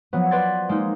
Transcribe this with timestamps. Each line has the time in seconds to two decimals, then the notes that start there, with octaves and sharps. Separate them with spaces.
0.13 F3 F#3 B3
0.31 B4 D5 C6 G#6 A6
0.69 G#3 A#3 D#4